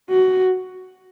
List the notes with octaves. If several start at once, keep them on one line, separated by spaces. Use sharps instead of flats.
F#4